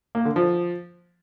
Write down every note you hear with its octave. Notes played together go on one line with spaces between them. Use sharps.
A#3
D3
F3